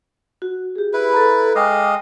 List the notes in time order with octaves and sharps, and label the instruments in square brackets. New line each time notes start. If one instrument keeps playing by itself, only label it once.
[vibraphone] F#4
G4 G#4
[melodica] E4 B4
[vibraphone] A4 A#5
[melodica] G#3 D#5 F5 [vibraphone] G5 D6 D#6